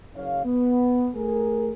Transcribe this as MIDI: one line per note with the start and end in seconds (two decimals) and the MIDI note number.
0.15 0.44 30
0.15 0.44 49
0.15 0.44 73
0.15 0.44 77
0.45 1.10 59
1.15 1.71 57
1.15 1.71 68
1.15 1.71 70